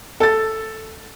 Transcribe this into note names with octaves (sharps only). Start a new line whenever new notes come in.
A4 A6